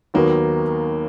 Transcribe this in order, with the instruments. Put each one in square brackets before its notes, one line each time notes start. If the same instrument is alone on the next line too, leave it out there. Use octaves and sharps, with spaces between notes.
[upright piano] D#2 D#3 F#3 B3 [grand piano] A#3